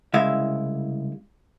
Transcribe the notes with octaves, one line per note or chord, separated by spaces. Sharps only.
C2 C#3 G#3 E4 E5 F5